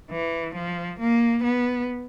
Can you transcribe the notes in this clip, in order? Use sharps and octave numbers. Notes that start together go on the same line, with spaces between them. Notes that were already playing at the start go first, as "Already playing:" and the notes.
E3
F3
A#3
B3